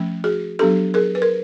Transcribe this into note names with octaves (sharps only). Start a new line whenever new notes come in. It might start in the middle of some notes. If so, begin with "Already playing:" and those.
Already playing: F3 A3 C#4
F#4 G#4
F#3 B3 D4 G4 A4
G#4 A#4
B4
A#4